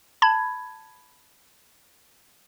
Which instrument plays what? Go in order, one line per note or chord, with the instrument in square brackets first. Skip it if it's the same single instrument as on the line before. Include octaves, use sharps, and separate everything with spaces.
[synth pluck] A5 B5 G#6